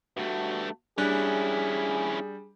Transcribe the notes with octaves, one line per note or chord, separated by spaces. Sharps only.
G2 A3 F#4
G3 C#4 D4 E4 G#4 F#6